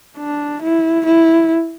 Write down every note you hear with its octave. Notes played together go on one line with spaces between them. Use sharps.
D4
E4
E4